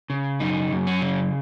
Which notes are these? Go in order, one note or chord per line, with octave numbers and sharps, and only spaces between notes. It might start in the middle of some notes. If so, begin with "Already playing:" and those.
C#3
F#2 D#4
F#2
C#4
C#3